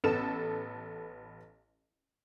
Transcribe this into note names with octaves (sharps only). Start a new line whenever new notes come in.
A1 B3 A4 B4 E7